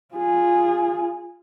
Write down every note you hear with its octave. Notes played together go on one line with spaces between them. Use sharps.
F4 G#4